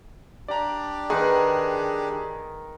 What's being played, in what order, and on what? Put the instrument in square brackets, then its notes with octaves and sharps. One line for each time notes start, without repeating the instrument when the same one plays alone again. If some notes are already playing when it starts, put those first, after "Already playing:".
[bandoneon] D4 G4 [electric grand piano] D5 A#5
[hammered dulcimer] D#3 B4 [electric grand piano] G#4